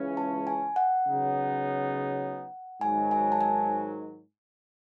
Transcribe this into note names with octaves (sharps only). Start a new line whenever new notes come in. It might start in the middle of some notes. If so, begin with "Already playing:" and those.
Already playing: C#2 C#3 E3 G#3 C#4
A5
G#5
F#5
C#3 F#3 B3 D#4
G#2 D#3 F#3 G#5
G#5
A5
G#5